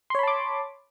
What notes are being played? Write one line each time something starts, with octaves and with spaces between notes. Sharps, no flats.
C#5 A5 B5 C6 D6